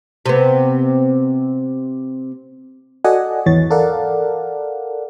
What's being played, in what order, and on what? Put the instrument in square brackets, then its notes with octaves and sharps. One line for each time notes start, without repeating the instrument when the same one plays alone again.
[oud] C3 B3
[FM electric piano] F#4 A4 D5 D#5 F#5 G#5
G#1 E2 E3 C#5 A6
A4 A#4 D5 F5 F#5